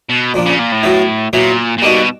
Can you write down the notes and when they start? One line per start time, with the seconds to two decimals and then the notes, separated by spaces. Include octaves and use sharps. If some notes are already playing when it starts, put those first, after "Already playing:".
0.09 B2
0.34 A#2 F3 A#3 D4
0.46 C#3
0.59 A#2
0.72 A2
0.83 F#3 B3 E4
1.33 A#2 F#3 B3 E4
1.78 A#2
1.82 B2 G3 A#3 D#4 F#4